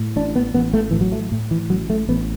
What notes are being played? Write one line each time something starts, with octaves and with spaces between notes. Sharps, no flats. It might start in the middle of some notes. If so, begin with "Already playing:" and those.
Already playing: A2
A1 D4
B3
A1 B3
A3
A2 E3
F#3
A3
A2
E3
A1 F#3
A3
A1 B3